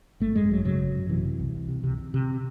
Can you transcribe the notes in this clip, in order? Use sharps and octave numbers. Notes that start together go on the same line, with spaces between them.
G#1 A3
F#2 G#3
G#1 F#3
C#3 F#3
G#1
F#2
C3 E3
C3
C2
C2
C3
C3
C3
C3